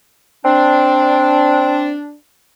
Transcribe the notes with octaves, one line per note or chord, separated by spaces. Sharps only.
C4 D4